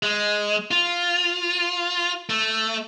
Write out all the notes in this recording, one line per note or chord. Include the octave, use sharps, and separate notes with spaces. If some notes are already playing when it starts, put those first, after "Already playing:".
G#3
F4
A3